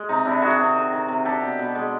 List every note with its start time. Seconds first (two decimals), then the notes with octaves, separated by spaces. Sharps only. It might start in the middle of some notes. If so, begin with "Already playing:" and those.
Already playing: G#3
0.09 C3 D#4
0.25 C3 D4 E4
0.42 D#3 F#4 G#4
0.59 C3
0.75 D#3
0.92 D#3
1.08 C3
1.25 D4 G4 A4
1.42 B2
1.59 B2
1.75 G#3